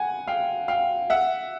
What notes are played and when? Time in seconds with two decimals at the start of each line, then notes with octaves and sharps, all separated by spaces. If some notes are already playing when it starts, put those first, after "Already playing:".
Already playing: F#5 G#5
0.28 F5 G5
0.68 F5 G5
1.10 E5 F#5